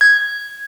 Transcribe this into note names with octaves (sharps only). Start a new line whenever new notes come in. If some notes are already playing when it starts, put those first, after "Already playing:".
G#6